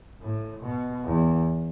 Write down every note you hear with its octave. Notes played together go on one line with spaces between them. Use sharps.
A2
B2
E2